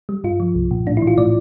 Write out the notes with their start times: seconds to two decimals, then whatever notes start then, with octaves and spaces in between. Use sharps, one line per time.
0.09 G3
0.24 G2 F4
0.40 F3
0.55 C2
0.71 A#2
0.86 A2 D4
0.97 E4
1.02 E3
1.07 F4
1.18 A2 D5